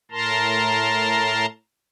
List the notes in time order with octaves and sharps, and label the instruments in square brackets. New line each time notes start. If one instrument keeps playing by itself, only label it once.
[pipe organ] A2 A#4 A5 A#5 C6